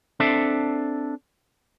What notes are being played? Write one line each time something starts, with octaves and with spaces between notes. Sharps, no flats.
C4 D4 A4 E5